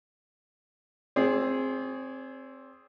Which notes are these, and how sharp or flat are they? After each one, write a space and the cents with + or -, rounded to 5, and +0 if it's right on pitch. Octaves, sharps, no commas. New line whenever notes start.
C4 +10 G#4 +0 D5 -45